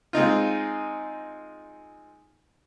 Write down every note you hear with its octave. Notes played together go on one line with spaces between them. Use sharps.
G#3 C4 D#4 F4